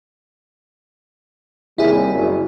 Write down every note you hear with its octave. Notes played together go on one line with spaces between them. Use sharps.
D#2 C3 G3 E4 G#4
F#1